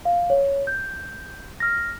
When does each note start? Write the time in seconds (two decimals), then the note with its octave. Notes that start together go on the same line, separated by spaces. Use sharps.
0.05 F5
0.30 C#5
0.67 G6
1.60 F6 A#6